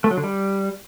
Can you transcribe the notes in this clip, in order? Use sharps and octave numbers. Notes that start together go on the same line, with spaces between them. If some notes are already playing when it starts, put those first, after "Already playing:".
A3
F#3
D3
G3